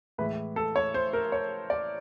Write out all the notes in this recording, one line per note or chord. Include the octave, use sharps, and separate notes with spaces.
A2 E3 G#3 B4
A4
C#5
C5
A#4
C#5
D5